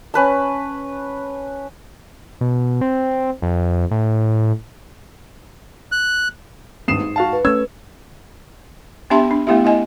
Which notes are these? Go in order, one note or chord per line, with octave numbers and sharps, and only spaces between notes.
C#4 B4 A5
B2
C4
F2
A2
F#6
G#1 G2 D#6 C7 E7
G#2
F#4 F5 A5
B4
A3 C#4 E6 G#6
B3 D4 G4 E5 A5 C6
D4
A3 B3 E4 G4 E5
E4 D#5 G#5